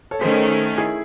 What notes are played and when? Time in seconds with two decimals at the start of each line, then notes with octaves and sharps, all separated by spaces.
0.11 A4 C#5
0.21 D#3 A3 C#4 G#4 C5
0.78 E4 G#4